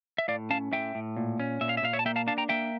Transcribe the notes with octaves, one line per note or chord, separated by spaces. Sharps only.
E5
A2 D5 F5
C#4 F5 A5
A2 E5 G5
A2
A#2
C#4
A#2 E5
F5
E5
A#2 F5
C#5 E5
A5
A#3 E5 G5
F5 A5
D4 F5 A5
G5 A#5
A#3 E5 G5